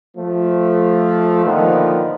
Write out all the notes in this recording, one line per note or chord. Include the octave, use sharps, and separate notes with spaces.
F3 A3
A#2 D3 D#3 F3 B3